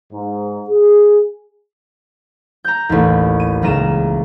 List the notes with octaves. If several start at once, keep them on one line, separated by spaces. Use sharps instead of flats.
G#2
G#4
A#5 G6
A1 D#2
D#7
D#1 C#2 A#5 D#7 E7